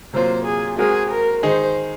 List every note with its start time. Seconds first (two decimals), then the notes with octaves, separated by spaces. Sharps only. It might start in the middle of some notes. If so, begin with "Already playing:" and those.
0.13 C3 F#3 A#3 F4 C5
0.45 G#4
0.78 G#3 C4 F#4 G#4 A#4
1.11 A#4
1.43 D#3 G#3 D#4 G#4 C5